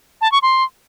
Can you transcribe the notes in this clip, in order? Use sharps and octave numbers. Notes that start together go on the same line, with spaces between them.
A5
C#6
C6